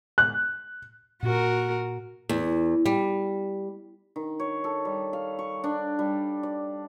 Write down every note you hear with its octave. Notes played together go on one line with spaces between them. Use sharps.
F#6
A#2 F#4 A#4
E2
G3
D#3
C#5
A4
G3
F5
C#6
D4
G3
D5